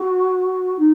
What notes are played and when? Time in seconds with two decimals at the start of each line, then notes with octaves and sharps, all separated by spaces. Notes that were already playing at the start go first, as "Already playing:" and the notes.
Already playing: F#4
0.78 D#4